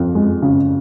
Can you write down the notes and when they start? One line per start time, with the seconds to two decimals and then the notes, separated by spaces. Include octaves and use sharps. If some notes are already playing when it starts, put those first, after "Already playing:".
Already playing: F2
0.15 G#3
0.42 C#3